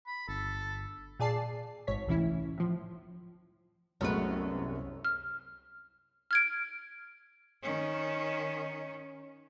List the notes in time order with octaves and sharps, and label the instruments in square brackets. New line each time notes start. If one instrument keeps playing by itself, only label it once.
[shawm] B5
[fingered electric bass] G1 [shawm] A4
[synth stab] A#2 G#4 D5 A5 C7
G#1 G#2 C#5 B6
C2 A2 E3 C#4 E4
A2 F3
[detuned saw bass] C2 [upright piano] F#2 [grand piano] G#3 A3 B3 [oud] C#4 B4
[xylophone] F6
F6 G#6 D7
[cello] D#3 C#4